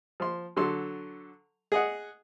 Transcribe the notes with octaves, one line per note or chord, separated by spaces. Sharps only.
F3 C6
D3 F#3 A4 C6
G#4 D#5 F#5